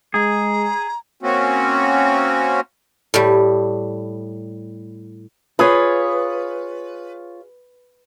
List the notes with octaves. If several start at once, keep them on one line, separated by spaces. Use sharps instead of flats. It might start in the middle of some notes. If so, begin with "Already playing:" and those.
G#3 G#4 A#5
A#3 C4 C#4 F#4
A2 G3
F4 G#4 B4 C#5